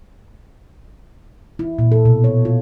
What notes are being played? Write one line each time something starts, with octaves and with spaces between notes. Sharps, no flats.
E4
A#2
A4
B2
C#5
F4